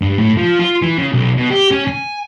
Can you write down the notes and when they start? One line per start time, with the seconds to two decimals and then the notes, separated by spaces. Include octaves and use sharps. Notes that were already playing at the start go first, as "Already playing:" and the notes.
0.02 G2
0.18 A2
0.37 F3
0.60 F4
0.83 E3
0.99 C#3
1.13 B1
1.37 B2
1.50 G4
1.71 C#4
1.88 G#5